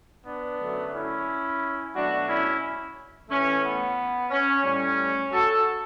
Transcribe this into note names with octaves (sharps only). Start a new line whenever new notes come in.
B3 D4
F#2 D3 F#3 A3
C#4 E4
B2 F#3 A3 D4 F#4
C#4 E4
A2 E3 A3 C#4
B3
C#4
A2 G3 C#4
F#4 A4